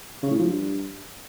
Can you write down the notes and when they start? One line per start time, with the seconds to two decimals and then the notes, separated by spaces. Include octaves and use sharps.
0.23 C#3
0.31 A2
0.38 F3
0.46 G2